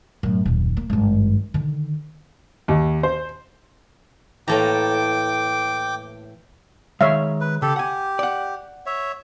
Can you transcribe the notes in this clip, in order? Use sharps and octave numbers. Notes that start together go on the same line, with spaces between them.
F#2 A2
D#1 F#2
A#3
G#1 G2
D3 D#3
D#2
C5
A2 E3 A#3 A4 G5 A#5 D6
D#3 G#3 C#5 E5 F5
B4
C#3 G4 A4
G4 F#5 G#5
D5 F#5
C#5 E5